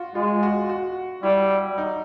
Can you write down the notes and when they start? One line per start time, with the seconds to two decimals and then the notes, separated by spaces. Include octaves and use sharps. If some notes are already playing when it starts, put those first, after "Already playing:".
Already playing: F4 F#4
0.15 G#3 F4
0.43 F#4
0.69 F#4
1.23 G3 E4
1.78 D#4